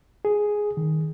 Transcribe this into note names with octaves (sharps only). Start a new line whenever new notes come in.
G#4
D#3